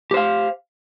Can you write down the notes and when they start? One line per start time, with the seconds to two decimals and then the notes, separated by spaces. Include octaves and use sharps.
0.11 G4
0.14 C5
0.17 F5